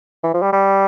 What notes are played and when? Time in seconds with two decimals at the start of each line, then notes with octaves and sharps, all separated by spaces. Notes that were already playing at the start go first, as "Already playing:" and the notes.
0.24 E3
0.34 F3
0.42 G3
0.53 G3